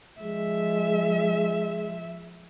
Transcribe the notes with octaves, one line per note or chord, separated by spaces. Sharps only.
F3 G#3 E5